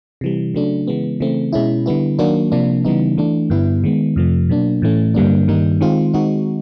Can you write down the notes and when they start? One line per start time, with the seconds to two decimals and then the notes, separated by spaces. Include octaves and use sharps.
0.21 C3 E3 G3
0.54 C#3 F#3 A3 D4
0.87 C#3 E3 G#3 B3
1.20 C#3 E3 A3 C4
1.53 B2 G#3 C#4 E4
1.86 D3 G3 B3 E4
2.19 D#3 F#3 A#3 D4 F#4
2.52 C3 F3 A#3 D4
2.85 C#3 E3 G3 B3 D#4
3.18 E3 A3 D4
3.50 G2 D3 G3 B3 E4
3.84 D#3 G#3 B3
4.16 F2 C3 F3 A3
4.49 B2 F#3 A#3 D4
4.82 A2 E3 A3 C#4
5.14 G2 D3 G3 A#3 D4
5.48 G2 D#3 G3 A#3 D#4
5.81 D#3 G#3 C4 F4
6.14 D#3 G#3 C4 D#4 F#4